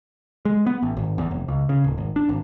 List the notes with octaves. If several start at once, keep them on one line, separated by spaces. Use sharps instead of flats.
G#3
B3
A1
G#1
E2
F1
C#2
C#3
D1
G#1
D4
G#1